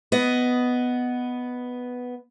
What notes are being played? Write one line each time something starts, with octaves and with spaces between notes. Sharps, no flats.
B3 D#5